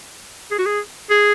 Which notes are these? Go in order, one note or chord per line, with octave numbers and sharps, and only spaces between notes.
G#4
F#4
G#4
G#4